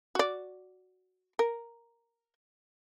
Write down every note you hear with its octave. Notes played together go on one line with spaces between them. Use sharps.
F#4 D5
A#4